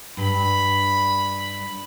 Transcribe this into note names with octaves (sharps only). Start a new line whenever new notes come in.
G2 B5